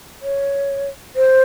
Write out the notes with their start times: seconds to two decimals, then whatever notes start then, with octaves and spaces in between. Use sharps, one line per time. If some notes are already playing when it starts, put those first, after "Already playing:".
0.22 C#5
1.16 C5